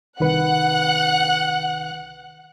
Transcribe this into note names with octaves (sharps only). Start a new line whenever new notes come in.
C2 D#3 B4 F#5 F#6